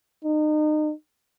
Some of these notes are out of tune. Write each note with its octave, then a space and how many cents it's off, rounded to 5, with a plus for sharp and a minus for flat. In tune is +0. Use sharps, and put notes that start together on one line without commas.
D#4 -30